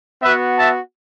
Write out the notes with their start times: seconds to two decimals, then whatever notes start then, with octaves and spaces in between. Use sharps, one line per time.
0.22 B3 F#4 B4 E5
0.59 E5 A5